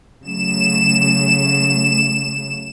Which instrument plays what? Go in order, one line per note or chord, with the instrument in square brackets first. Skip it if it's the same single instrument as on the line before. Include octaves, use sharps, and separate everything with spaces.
[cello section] C#3 F#3 A3 [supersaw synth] E7